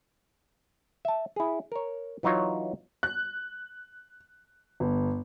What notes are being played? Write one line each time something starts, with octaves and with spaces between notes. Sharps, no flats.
E5 A5
E4 G#4
A#4 C#5
E3 F#3 D#4 F4 C#5
F#6
G1